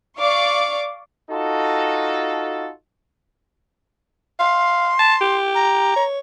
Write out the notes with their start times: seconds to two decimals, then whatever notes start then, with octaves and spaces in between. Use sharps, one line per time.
0.18 D5 F5 C#6 D6
1.30 D#4 F4 F#4 A4
4.40 F5 C6
4.99 A5
5.21 G4
5.55 A#5
5.97 C#5